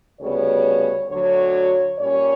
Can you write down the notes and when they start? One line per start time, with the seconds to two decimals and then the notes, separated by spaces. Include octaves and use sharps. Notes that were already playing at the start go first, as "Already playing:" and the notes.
0.20 D2 C#3 G3 B3 C#5
1.09 D2 D3 F#3 C#5
1.99 A#2 G3 C#4 C#5